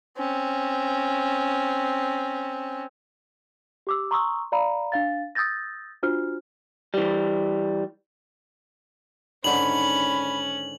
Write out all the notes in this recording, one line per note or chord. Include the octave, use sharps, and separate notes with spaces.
C4 C#4
G4 D6 E6
A#5 C6 C#6 D#6 E6
D5 F5 A#5 B5
D4 F5 A6
D#6 E6 G6 A6 A#6
D4 F4 F#4 C5 F6
E3 G3
G#2 D3 D#3 C#4 B5 F#7